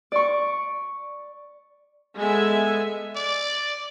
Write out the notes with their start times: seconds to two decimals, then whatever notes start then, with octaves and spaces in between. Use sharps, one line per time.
0.12 D5 C#6
2.18 G#3 B3 A4 E5 G#5
3.16 D5